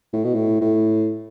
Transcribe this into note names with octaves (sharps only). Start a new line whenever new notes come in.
A2
B2
A2
A2